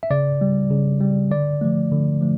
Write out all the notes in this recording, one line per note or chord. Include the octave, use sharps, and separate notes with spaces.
E5
C#3 D5
G3
C#3
G3
D3 D5
F3 A3
D3
F3 A3